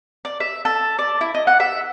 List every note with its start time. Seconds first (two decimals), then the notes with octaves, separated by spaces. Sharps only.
0.25 D5
0.40 E5
0.65 A4
0.99 D5
1.21 E4
1.35 D#5
1.47 F#5
1.60 E5